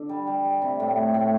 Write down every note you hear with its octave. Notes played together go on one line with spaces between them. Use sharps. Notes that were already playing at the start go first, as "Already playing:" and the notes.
Already playing: D3
G3
G3
G3
C3
A2
C3
A2